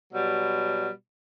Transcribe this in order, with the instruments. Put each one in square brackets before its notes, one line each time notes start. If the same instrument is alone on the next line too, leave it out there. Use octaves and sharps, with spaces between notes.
[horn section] B2 F#3 G3